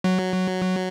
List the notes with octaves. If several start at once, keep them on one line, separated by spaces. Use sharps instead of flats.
F#3